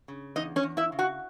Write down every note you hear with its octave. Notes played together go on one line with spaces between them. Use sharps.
C#3
E2 D#4 D#5
C#4 C#5
E2
E4 E5
C#3
F#4 F#5